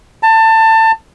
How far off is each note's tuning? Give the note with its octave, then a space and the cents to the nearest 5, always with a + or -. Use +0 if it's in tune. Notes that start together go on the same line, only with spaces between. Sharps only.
A5 +25